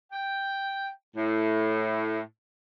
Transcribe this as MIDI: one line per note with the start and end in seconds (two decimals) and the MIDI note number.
0.12 0.87 79
1.15 2.20 45